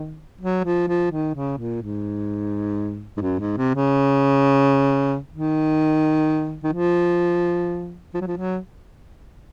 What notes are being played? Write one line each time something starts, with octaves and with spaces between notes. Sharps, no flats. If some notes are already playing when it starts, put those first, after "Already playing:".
Already playing: D#3
F#3
F3
F3
D#3
C#3
A#2
G#2
G#2
F#2
G#2
C3
C#3
D#3
D#3
F3
F3
F#3
F3
F#3